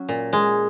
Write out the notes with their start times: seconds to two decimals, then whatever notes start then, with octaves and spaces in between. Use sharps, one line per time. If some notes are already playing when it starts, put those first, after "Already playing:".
Already playing: F#3 C#4
0.09 A#2
0.33 G#3